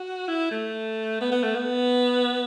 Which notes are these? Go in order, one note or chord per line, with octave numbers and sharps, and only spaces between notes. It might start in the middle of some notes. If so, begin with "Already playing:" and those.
Already playing: F#4
E4
A3
B3
B3
A3
B3